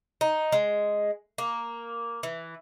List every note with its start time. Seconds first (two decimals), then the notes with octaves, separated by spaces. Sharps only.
0.21 D#4
0.52 G#3
1.38 A#3
2.23 E3